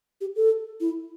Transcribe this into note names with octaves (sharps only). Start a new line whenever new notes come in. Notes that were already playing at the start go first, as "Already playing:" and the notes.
G4
A4
E4